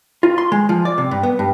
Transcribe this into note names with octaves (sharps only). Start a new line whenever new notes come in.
F4
C6
G#3
F3
D5
C3
G2
B3
G2